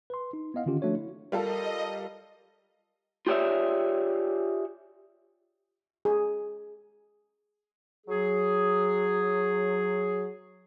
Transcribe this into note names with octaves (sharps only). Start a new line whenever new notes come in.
B4 C6
D#4
B3 E4 D#5 F5 F#5
D3 D#3 C#4 F4 G4
F3 A3 D4 F#4 C#5
E4
G3 F4 A4 A#4 D#5
F4 G4 G#4 C#5 D5 E5
G#4
F#3 G#4